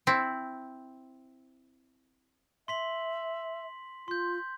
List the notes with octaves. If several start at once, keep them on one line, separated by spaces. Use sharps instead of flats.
C4 E4
E5 C6 B6 F#7
F4 C6 G6